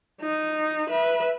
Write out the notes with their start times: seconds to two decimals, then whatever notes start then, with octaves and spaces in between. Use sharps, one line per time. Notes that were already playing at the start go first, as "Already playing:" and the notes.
0.21 D#4
0.89 B4 E5